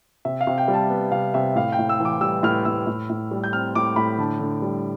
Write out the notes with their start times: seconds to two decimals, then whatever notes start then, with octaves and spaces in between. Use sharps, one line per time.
0.25 C3 E5
0.41 F5
0.47 C3
0.58 G5
0.68 G3
0.74 A5
0.90 B3
1.12 C3 F5
1.34 C3 E5
1.55 A2 F5
1.72 G5
1.78 A2
1.89 E6
2.00 E3
2.05 D6
2.21 G3 E6
2.43 A2 F6
2.65 A2 E6
2.87 A2
3.10 A2
3.31 G3
3.44 G6
3.53 C4 F6
3.75 A2 D6
3.96 A2 B5
4.18 D3 A5
4.40 D3
4.62 G3